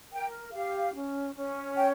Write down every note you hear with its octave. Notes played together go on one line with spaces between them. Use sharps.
A#4 G5
G4 F5
C#4
C#4
C#5 G5